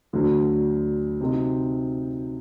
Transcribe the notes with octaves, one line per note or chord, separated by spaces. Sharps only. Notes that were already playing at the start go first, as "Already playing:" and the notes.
D2 D3 F#3
C3 F#3 C4 D#4